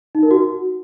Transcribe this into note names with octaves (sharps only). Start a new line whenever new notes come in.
D#4
A#4
F#4